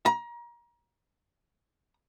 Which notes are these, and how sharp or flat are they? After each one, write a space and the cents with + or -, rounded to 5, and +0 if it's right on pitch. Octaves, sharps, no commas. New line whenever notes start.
A#5 +30